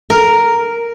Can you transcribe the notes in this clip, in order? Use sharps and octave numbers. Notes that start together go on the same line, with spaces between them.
A#4